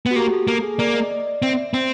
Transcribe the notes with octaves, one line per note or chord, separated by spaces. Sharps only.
B3
F#4
A#3 G4
A4
A#3 A4
G#4
A#3 D5
D#5
D5
D5
C4 E5
C4